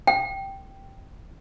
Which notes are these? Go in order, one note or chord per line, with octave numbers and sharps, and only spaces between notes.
G5